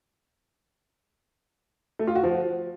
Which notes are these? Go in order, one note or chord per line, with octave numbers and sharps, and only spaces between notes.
A3
F4
F#4
F3